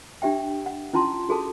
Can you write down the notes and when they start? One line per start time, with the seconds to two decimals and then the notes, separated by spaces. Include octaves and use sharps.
0.22 D4 G4 E5 G5
0.66 F#5
0.93 C#4 E4 F4 A5 C6
1.29 F#4 G#4 A4 A5